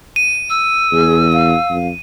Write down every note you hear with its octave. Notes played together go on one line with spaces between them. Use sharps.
D#7
E6
E2 G#4
F5
F2